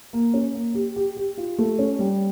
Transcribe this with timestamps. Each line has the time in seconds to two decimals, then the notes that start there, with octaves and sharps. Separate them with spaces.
0.13 A#3
0.34 C#4
0.54 A#3
0.74 G4
0.96 G4
1.17 G4
1.38 F4
1.58 A3
1.79 C#4
1.99 G3